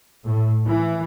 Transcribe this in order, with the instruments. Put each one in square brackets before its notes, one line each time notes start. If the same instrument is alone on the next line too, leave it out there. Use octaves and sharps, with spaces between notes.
[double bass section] A2
E3